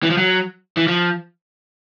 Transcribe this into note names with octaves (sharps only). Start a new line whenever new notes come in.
E3
F3
F#3
E3
F3